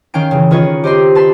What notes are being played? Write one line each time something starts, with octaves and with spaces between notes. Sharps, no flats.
D#3 C#4 F5 G5 D7
C#3 E3
D#3 F4 B4 C#5 D#5
G4 C5 D#5 C6
B4 A5 C6 B6